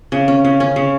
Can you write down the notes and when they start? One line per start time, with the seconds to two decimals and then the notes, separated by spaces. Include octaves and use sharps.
0.12 C#3
0.28 C#4
0.45 C#3
0.60 C#4
0.76 C#3